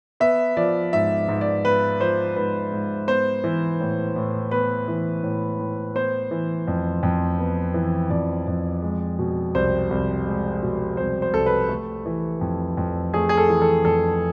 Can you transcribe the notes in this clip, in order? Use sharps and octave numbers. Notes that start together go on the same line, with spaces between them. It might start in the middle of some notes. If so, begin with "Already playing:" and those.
B3 E5
F3 D5
G#2 E5
G#2
D5
B3 B4
F3 C5
G#2 B4
G#2
B3 C5
E3
A2
A2
B3 B4
E3
A2
A2
B3 C5
E3
F2
F2
B3
E3
F2 D5
F2
G#3
B2
C2 C5
C2
G#3
B2
C2 C5
C5
C2 A4
B4
A3
E3
F2
F2
A3 G#4
G#4
A4
E3
A4
F2 A4